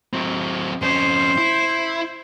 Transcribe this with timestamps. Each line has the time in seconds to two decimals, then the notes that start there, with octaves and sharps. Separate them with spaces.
0.13 F#3 C4
0.82 F2 C#4 C5
1.38 E4